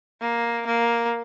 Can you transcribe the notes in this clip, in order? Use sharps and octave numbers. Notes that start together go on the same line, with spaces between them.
A#3
A#3